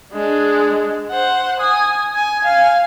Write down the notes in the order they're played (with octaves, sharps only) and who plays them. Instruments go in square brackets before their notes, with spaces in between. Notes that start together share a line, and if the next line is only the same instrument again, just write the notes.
[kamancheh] G#3 D4
C5 F#5
G#5 D#6
G#5
F5 G#5